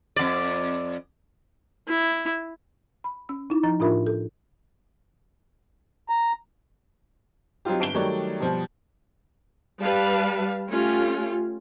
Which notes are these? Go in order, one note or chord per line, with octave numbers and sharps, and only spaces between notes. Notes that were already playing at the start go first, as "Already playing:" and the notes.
F2 D5
E4
B5
C#4 E6
D#4 E4
F3 D#4 A#5 A6
A2 D4 F4 A#4 E5 B5
A4
A#5
F#3 C4 D#4 F4 G4
G1 D7 G7
D#3 F#3 G3 A3 C#5 D5
B2 F3 G3
G3 B4 F5 A5
A3 C#4 F4 G4